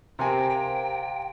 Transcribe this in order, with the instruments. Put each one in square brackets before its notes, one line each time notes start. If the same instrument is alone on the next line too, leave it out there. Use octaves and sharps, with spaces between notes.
[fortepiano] C3 G#5 [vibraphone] G4 A#4 C5 [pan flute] G5
[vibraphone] F5 A#5